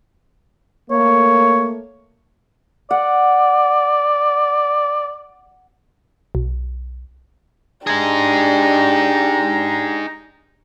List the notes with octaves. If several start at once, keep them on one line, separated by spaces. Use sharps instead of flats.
A3 A#3 C#5
D5 F#5
B1
D4 D#4 G4 G#4 A#5